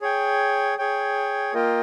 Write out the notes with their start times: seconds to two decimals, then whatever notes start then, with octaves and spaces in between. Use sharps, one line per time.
0.01 G#4 C#5 G5
0.78 G#4 C#5 G5
1.54 A#3 F4 A#4 D#5 G5